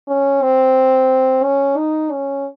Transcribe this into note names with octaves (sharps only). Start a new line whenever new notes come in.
C#4
C4
C#4
D#4
C#4